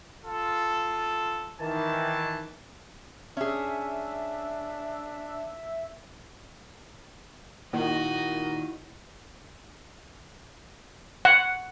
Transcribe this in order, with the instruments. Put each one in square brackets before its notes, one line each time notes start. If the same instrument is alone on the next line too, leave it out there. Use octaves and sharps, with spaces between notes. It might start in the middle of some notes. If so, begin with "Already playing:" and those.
[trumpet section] F4 A4
[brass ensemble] D#3 E3 A5
[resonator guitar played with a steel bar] C#4 G#4 [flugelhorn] D4 [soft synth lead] E5
[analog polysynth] A#2 D#3 [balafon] A#3 [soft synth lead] E4 [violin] F#4 D#5
[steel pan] F#5